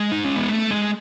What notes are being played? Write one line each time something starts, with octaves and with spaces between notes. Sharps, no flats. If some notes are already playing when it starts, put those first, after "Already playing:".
Already playing: G#3
D#4
C#4
B3
A3
G#3